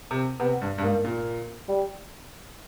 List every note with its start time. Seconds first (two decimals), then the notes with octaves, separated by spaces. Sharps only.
0.11 C3
0.40 C3 B3
0.62 G2
0.78 G2
0.82 G#2 A#3
1.04 A#2
1.68 G3